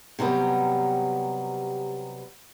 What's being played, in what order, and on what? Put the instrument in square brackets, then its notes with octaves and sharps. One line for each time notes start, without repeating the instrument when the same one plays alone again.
[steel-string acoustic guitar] C3 F#3 G3 B3